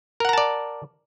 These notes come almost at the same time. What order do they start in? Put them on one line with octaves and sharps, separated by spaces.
A#4 F#5 A#5 A5 D5